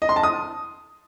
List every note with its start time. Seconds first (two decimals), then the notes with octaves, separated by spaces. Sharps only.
0.02 D#5
0.09 C6
0.16 A5
0.23 D#6